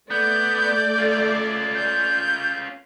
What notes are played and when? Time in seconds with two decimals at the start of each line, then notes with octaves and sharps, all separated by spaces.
0.11 A3 B3 D5 G6
0.98 C#4 F4
1.75 G6